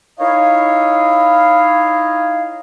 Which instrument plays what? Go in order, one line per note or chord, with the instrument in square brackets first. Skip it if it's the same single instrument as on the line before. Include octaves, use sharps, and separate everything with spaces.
[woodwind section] D#4 E4 C#5 D#5 F5